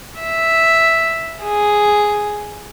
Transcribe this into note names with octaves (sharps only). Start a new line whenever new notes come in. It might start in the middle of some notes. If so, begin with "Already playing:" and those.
E5
G#4